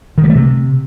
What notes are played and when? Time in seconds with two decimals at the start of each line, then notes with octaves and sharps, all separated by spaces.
0.18 D#3
0.24 G3
0.30 A3
0.35 C3